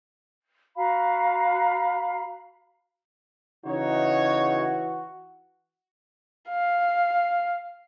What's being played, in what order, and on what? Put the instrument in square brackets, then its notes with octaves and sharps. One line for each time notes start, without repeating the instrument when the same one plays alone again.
[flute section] F#4 F5 A#5 B5
[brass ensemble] C#3 D#4 C#5 [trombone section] E3 F#4
[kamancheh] F5